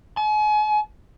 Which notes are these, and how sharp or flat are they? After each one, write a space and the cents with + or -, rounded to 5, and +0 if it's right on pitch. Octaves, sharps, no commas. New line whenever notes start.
G#5 +40